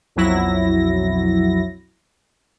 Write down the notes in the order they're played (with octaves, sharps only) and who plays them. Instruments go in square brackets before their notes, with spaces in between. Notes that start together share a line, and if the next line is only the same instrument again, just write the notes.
[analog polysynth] B1 F2 F#3 E4 A#6